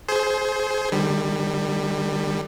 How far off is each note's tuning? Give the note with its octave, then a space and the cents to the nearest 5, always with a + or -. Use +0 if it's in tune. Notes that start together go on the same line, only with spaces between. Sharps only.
G#4 +30 C5 +0
D#3 -45 G3 +15